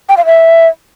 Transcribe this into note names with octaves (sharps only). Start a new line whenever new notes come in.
G5
F5
E5